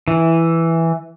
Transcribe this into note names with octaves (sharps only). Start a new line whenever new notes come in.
E3